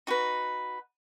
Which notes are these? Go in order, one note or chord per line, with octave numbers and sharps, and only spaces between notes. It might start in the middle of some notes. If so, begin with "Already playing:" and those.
D#4 F#4 B4